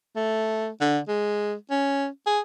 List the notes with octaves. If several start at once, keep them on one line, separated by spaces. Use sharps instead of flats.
A3
D3
G#3
C#4
G#4